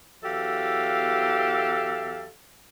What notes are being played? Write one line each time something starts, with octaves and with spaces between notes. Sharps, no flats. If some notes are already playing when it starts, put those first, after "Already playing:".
E2 F#3 G4 A4 E5 F5